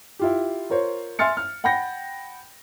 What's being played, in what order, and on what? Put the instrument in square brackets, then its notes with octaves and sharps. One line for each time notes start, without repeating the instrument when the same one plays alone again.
[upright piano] E4 F4 G4
F4 A#4 C5 C#5
E5 G#5 C6 F6 A6 C#7
F6
F#5 G5 B5 G6 A#6